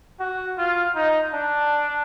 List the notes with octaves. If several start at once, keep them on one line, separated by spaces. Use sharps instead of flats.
F#4
F4
D#4
D4